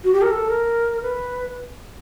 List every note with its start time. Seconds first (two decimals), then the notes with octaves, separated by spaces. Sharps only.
0.04 F#4
0.13 G4
0.22 A#4
0.30 A4
0.49 A#4
1.02 B4